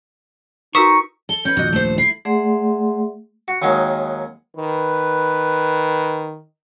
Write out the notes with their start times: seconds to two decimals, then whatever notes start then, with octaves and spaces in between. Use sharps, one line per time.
0.75 D#4 F#4 A#4 B4 C#6 D#6 B6 E7
1.29 A4 G7
1.45 C#4 B4 G6
1.57 A#1 D#2 F#4 D#5
1.73 A3 C5
1.98 E4 C7
2.25 A3 G#4 D5 E5 F#5 C6
3.48 F#4
3.62 D#2 D#3 F#3 G#3
4.57 D#3 B4